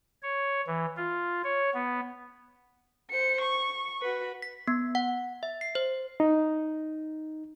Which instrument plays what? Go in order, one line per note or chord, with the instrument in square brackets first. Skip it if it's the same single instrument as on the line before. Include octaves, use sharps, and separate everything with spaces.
[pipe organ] C#5
E3
F4
C#5
B3
[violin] C5 C#7
C#6
F#4 B4
[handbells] B6
B3
F#5
E5
C7
C5
[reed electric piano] D#4